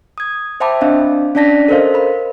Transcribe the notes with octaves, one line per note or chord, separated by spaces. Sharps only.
D#6 G#6
C5 E5 G5 A5 B5 D6
C4 D4 D#5 F5
C#4 D4 D5 A5 A#6 B6
A4 A#4 C5 D#5 F5
A#4 B5